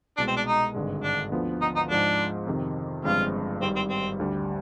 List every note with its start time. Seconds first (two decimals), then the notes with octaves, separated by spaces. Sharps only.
0.17 C2 B2 G#3 D4
0.28 C4
0.36 D4
0.47 D#4
0.74 G#1 G2 D3 G#3
1.03 D4
1.32 D2 D3 F3 B3
1.62 D#4
1.76 D#4
1.90 G#2 F3 G#3 D4
2.47 F2 C3 D#3
3.04 G1 G2 F3 G#3 C4 F4
3.62 G#1 G#2 G3 C4
3.76 C4
3.90 C4
4.19 D2 D3 G3